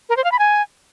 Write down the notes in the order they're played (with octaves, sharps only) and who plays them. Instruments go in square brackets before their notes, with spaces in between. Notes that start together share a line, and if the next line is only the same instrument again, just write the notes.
[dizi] A#4
C5
F5
B5
G#5